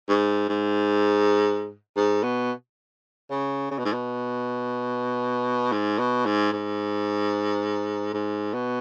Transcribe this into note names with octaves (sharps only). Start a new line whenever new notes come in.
G#2
G#2
G#2
B2
C#3
C#3
B2
G#2
B2
G#2
B2
G#2
G#2
G#2
B2